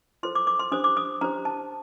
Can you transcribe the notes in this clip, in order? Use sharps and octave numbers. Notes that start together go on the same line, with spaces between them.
F4 A4 C5 C6
D6
D6
C6
D4 G4 C5 D#6
D6
D#6
D4 G4 C5 A#5
A5